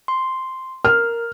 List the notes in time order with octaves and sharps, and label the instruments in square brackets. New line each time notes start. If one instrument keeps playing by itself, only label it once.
[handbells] C6
[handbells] A#4 [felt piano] F6